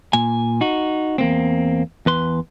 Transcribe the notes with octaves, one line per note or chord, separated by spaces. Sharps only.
A#2 G#5
D#4 F#4
E2 A#3 C4
E2 B4 C6